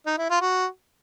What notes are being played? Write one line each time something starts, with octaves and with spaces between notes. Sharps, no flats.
D#4
E4
F4
F#4